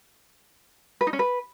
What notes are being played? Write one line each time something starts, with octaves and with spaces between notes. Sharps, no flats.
B4
D#4
C#4
B4